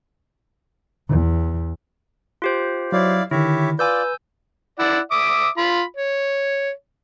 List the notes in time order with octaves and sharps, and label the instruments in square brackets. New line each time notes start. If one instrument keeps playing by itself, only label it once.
[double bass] E2
[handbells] F4 G4 C5
[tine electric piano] F#3 C#5 [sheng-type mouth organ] E4 D5 F5
[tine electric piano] D3 D#3 [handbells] E4 [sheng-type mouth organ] G4 C#5 E5
[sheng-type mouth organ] F4 D5 [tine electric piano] B4 [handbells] G#5 E6 G6
[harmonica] E4 D5 F#5
E5 D6 D#6
F4 B5
C#5